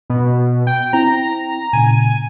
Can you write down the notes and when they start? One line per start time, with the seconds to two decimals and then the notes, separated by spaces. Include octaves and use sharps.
0.10 B2
0.67 G5
0.93 C4 E4 G5 A#5
1.73 A#2 C#3 G#5